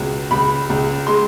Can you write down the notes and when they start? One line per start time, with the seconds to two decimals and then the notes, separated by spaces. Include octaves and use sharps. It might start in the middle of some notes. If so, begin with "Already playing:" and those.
Already playing: C#2 B2
0.31 C#2 B5
0.70 C#2
1.07 G#3 C6